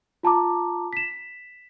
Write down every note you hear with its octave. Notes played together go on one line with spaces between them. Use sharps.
F4 A5 A#5 D6
B6 E7